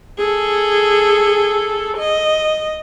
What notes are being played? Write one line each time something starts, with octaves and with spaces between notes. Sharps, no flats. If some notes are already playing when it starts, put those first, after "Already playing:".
G#4 A4
D#5